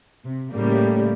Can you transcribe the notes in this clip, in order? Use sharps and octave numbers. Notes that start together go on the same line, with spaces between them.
C3
A2 C#3 G3 A3 A#3